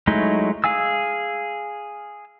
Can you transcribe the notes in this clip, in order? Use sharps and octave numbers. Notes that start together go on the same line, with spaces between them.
F#3 G#3 A3 D#4 E4
G#4 F5 G#5 E6